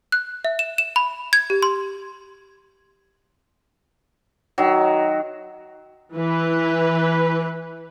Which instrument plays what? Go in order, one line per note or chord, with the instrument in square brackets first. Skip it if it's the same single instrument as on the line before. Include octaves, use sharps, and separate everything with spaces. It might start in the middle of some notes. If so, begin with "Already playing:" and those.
[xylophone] F#6
E5
E7
E7
B5
G#6
G4
C6
[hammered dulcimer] D#3 F#3
[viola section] E3 B4